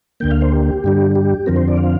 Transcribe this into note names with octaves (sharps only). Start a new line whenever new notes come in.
D2 D3 A#3 G5
F5
C5
G4
G2 D3 G3
G4
F2 D3 F3 C4 A#4
C5
D5
F5